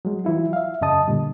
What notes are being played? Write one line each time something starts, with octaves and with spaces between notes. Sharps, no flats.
F#3 G#3
E3 F#3 E4 F4
E5 F5
F#2 C#3 D#5 A5 D#6
A#2 D3 G3